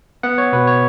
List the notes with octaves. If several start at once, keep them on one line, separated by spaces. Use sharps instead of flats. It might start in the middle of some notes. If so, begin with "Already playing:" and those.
B3 F#5
C#5
B2 B4
C#5